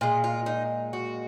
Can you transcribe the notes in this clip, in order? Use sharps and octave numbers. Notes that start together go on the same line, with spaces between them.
A#2 G#3 F4
F4
D#4
F#4